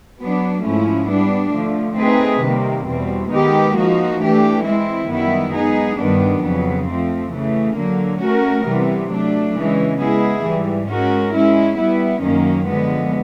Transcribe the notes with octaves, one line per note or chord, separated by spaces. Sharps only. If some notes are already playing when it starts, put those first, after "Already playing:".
F#3 B3 D4
G#2 F3 A3 C#4 E4
G3 B3 D4
D3 F3 A3
A3 C4 D#4 G#4 B4
C3 D#3 G3 A#3
E2 B2 G3 C4
D#3 G#3 B3 D#4 G4
F3 A#3 D#4 F#4
E3 A3 D4 G4
G#3 C4 E4
F#2 D#3 G3 B3 E4
G#3 B3 D#4 G#4
G2 D#3 G3 B3 D4
F2 C#3 F#3 B3
F3 A3 C4
C#3 E3 A3
D3 F#3 A#3
A3 C#4 F#4 A#4
C3 E3 G3 B3
F#3 A3 D4
C#3 E3 G#3
G#3 B3 E4 G#4
G#2 E3 G3
G#3 C#4 F#4 A#4
G#3 C#4 E4
G3 B3 E4
F#2 D#3 F#3 A#3 C#4
D3 F3 G#3 B3